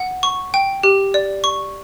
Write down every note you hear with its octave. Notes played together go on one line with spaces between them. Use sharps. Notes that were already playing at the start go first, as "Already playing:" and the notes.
Already playing: F#5
C#6
G5
G4
D5
C#6